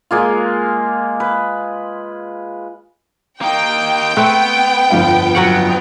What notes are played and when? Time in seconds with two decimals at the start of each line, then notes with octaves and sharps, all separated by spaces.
0.11 G#3 A#3 F4
1.20 B4
3.41 A#3 D#4 G5
4.17 A3 B3 C4 F#6
4.90 G1 F2 F5
5.35 F#3 B3 C#4 F#5